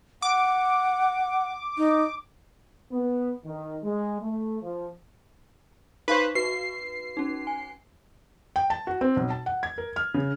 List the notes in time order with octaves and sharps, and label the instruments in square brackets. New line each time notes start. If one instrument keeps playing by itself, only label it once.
[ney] F#5 [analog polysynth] D6
[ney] D#4
[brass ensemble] B3
D#3
G#3
A3
F3
[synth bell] D#4 F5 C#6 [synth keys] B4 C5
[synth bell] F#4 B4 [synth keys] C7
[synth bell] C#4 D#4
G#5
[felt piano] G5
A5
F#4
C4
B1
A5
F#5
G#6
A#4
F6
C#3